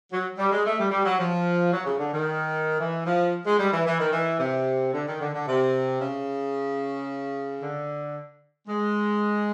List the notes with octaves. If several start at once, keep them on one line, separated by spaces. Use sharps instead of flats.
F#3
G3
G#3
A3
G3
G3
F#3
F3
F#3
C#3
D3
D#3
E3
F3
G#3
G3
E3
E3
D#3
E3
C3
D3
D#3
D3
D3
C3
C#3
D3
G#3